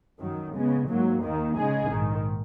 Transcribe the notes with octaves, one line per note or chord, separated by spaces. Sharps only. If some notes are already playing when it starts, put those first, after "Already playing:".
F#2 D#3 F#3
C#3 G#3 B3
G#2 F#3 A#3
D#2 D#3 A#3
C#3 G#3 D#4 G#4
A#1 G#2 D#3